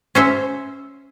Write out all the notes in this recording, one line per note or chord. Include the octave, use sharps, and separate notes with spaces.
C#4 C5 E5